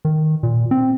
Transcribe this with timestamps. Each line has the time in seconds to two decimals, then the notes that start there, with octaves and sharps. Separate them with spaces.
0.05 D#3
0.43 A#2
0.71 C4